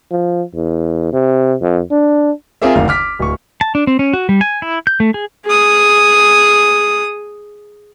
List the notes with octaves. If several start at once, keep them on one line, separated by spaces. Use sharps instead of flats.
F3
E2
C3
F2
D4
C4 F4 G#4 A#4 E5
F#1 D2 D#3 F5
D6 F6 B6
D1 C#6
A5
D4
C4
C#4
F#4
G3
G#5
E4
G6
A3
G#4
G#4 D#6